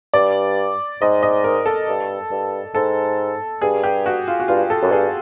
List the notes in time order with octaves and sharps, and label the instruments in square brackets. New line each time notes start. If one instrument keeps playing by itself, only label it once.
[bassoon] G2 [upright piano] D5
[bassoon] G#2 [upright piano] D#5
[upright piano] D#5
A#4
A4
[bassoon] G2
G2
[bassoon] G#2 [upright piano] A4
[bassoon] G2 [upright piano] G#4
[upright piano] G4
F#4
F4
F#4
[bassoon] G2 [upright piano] F4
[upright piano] A4
[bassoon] F#2
[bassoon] G2 [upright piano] G#4